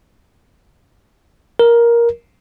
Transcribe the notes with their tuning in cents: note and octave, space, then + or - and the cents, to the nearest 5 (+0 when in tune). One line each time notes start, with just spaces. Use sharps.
A#4 +10